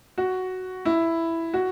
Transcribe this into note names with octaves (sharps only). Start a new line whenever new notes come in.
F#4
E4
F#4